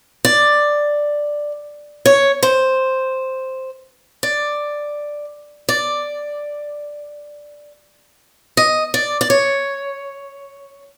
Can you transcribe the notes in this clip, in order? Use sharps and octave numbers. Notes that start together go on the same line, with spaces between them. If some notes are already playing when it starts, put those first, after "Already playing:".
D5
C#5
C5
D5
D5
D#5
D5
D5
C#5